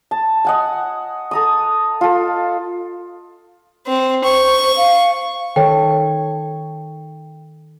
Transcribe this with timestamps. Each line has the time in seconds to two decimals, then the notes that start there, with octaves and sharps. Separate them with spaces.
0.11 A5
0.45 D#5 F#5 G#5
1.31 A4 A#5 D#6
2.01 F4 A4
3.87 C4
4.24 C5 C#6
4.76 F5
5.56 D#3 A4 C#5 G5